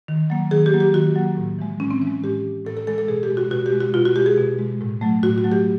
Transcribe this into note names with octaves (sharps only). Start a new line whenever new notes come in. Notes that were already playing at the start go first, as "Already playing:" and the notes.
D#3
F#3 A#3
D#3 G#4
G4
F#3 A#3
G4
D#3 F#4
F#3 A#3
A2
E3 G#3
A2 C#4
C4
E3 C#4
G#3
A2 G4
E3 G#3
A2 A4
A4
E3 G#3 A4
A4
B2 G#4
G4
G#3
F#4
B2 F#4
G4
G#3
F#4
B2 F4
F#4
G#3 G4
G#4
B2
G#3
A2
F#3 A3
A2 F#4
F#4
F#3 A3
G4